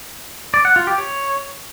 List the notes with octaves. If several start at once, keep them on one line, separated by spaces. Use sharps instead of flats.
D5
F#5
F4
G4
C#5